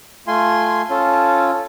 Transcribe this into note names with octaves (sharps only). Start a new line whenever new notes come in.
A3 F4 G#5 C6
C#4 F4 A4